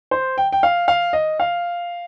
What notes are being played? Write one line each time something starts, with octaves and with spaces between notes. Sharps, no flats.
C5
G5
G5
F5
F5
D#5
F5